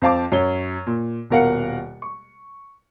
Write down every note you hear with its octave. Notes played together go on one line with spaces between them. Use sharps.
F2 C5 F5 A5 D6
F#2 C#5 G7
A#2
D#1 B2 A#4 F5 F#5 C#7
C#6